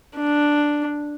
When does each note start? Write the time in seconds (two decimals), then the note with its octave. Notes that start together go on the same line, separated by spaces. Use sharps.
0.16 D4